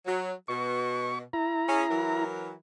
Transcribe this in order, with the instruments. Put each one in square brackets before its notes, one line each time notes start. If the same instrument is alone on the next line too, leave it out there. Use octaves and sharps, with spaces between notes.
[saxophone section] F#3
[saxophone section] B2 [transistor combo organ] C#6
[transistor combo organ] E4 A#5
[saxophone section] C#4 G#4
E3 F#3 A#4